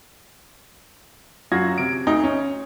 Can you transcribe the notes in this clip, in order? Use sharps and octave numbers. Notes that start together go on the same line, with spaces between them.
F#2 F4 F#4 G#6 A#6
C3 D7
D2 D#4
C#4